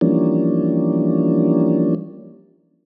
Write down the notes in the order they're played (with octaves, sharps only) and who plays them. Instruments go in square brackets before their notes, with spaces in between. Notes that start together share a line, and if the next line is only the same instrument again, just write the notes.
[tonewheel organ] E3 F3 G3 A#3 C#4 D4